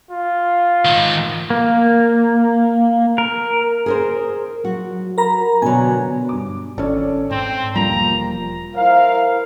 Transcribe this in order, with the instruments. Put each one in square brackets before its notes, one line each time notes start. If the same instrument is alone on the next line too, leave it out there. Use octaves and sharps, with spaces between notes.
[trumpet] F4
[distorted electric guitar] G#2 D#3
[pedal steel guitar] A#3
A#4
[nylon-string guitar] G#4 A#4 C5
[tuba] F#3 [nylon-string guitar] F#4
[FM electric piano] A#4 A#5 B5
[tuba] B2 [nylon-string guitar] D3 F#3 [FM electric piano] G#5
[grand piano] G2 D6
[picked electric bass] G#1 C#4 [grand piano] A4 C#5 D5
[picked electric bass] G#2 [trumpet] C4
[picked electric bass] E1 G3 [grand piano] F3 A#3 [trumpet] A#5
[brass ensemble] E4 A#4 C5 F5